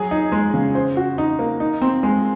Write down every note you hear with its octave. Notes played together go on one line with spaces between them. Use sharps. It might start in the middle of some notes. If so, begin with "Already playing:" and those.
Already playing: F#3 G#4
D#4
G#3
C#3
C5
F#4
D#4
A#3
D#4
C4
G#3